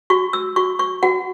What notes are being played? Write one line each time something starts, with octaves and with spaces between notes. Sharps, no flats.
F#4 C#6
E6
F#4 C#6
C#6
F#4 F#5